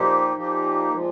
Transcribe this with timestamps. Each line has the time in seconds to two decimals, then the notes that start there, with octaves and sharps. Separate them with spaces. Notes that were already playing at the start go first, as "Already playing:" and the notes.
Already playing: A#2 F3 A#3 D#4 G4
0.35 A#2 F3 A#3 D#4 G4
0.92 A#2 F3 G#3